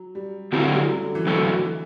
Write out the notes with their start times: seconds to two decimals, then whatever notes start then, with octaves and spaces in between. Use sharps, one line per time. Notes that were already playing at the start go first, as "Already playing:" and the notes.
Already playing: F#3
0.15 G3
0.52 D3 F#3 G3 C4 E4
0.64 A3
0.74 G3
0.90 F#3
1.02 D3
1.15 E3
1.27 A2 D3 F#3 C4 F#4 A4
1.65 E3